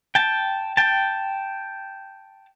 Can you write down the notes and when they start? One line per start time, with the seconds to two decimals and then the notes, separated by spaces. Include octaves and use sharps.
0.15 G5 A5
0.77 G5 A5